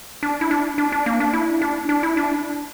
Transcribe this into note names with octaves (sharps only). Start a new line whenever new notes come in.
D4
E4
D4
D4
D4
A#3
D4
E4
D4
D4
E4
D4